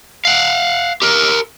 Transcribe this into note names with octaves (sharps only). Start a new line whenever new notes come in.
F5 F#5
G4 A#4